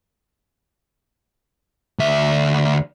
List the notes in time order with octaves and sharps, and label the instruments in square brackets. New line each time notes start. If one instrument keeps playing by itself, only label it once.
[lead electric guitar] D2 E5